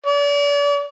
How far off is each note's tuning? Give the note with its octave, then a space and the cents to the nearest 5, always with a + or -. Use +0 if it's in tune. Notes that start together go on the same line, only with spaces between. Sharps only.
D5 -40